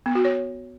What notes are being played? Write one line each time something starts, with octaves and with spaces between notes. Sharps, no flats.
B3
F#4
C#5